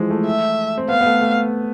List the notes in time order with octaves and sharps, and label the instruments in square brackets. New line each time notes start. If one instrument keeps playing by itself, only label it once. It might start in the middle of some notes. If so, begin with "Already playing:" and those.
Already playing: [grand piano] E3 F3 G#3
A3
[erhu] E5
[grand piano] C4
[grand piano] B3 [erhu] F5
[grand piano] B3
A3
A3